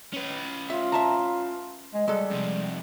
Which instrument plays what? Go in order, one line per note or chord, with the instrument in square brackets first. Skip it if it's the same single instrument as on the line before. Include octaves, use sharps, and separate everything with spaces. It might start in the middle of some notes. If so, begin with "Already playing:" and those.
[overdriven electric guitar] C#4 B4
[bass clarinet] F4 [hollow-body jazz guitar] E5
[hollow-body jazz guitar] E5 A5 A#5
[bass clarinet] G#3
[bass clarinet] G3 [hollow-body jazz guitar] G#3 A4
[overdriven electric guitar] F2 C3